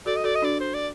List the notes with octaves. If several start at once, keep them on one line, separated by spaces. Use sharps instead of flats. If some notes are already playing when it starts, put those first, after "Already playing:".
F#4 A4 D5
D#5
F#4 A4 D5
D#5
D4 F#4 D5
C5
D5